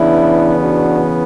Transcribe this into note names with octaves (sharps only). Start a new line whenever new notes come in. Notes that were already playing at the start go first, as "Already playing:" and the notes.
Already playing: C#3 E3 B3 D4 E4
D4 F#4